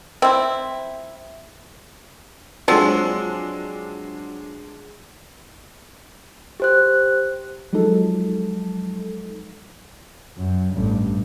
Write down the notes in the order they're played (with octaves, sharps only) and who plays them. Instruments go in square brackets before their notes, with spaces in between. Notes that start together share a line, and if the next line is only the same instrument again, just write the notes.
[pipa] C4 E4
[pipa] F3 [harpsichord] F#3 C4 A4 [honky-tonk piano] G#3 D4
[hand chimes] G4 C5 F#6
[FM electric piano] F3 F#3 G#3 D#4 A4
[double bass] F#2
A1 G2